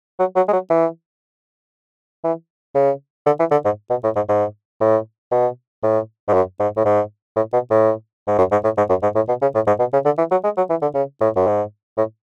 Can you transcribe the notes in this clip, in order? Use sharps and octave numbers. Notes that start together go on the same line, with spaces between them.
F#3
F#3
G#3
F#3
E3
E3
C#3
D3
E3
D3
G#2
B2
A2
G#2
G#2
A2
B2
A2
G#2
F#2
G#2
A2
G#2
A2
B2
A2
G#2
F#2
G#2
A2
G#2
F#2
G#2
A2
B2
C#3
A2
G#2
B2
C#3
D3
E3
F#3
G#3
F#3
E3
D3
C#3
A2
F#2
G#2
A2